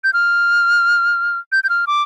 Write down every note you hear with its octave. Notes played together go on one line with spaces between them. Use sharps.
G6
F6
G6
G6
F6
D6